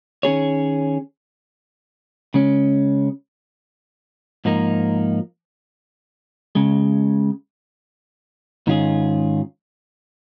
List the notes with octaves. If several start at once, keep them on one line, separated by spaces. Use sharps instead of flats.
D#3 C#4 G#4 C#5
C#3 G#3 C#4
G#2 F3 A#3 D#4 A#4
C#2 C#3 G#3
G#2 D#3 C#4 F4 G#4